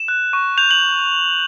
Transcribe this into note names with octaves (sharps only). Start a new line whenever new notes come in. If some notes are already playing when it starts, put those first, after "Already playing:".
Already playing: E7
F#6
C#6
G6 F7
F#7